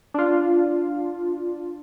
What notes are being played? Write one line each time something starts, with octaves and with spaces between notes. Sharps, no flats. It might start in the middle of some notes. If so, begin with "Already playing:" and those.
D4 F4